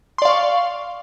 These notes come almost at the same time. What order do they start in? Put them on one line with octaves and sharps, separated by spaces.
C6 D5 F5 C#6